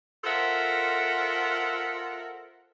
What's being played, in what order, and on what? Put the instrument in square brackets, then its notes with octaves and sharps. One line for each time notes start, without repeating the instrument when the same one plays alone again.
[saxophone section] F4 A4 A#4 C5 E5 F#5